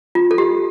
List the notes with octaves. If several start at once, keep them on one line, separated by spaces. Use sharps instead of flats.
F4
A4
G4